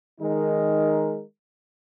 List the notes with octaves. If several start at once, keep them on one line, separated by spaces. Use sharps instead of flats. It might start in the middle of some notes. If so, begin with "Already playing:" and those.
D#3 G#3 D#4 A#4